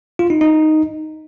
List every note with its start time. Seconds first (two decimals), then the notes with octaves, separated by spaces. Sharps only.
0.19 F4
0.30 D#4
0.41 D#4